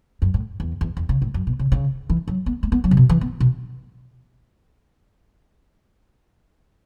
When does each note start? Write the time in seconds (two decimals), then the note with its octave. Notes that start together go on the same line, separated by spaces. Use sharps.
0.22 F#2
0.34 A2
0.60 E2
0.81 E2
0.97 E2
1.09 C#3
1.22 A2
1.34 F#2
1.47 B2
1.59 C#3
1.72 C#3
2.10 E3
2.28 F#3
2.46 B3
2.63 A3
2.72 B3
2.84 F#3
2.91 C#3
2.97 B2
3.09 E3
3.21 B3
3.40 B2